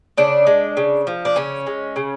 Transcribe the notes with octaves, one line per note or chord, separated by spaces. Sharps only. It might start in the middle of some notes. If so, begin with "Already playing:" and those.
C#3 D4
G#3
C#3
F3
D4
C#3 C#4
G#3
C#3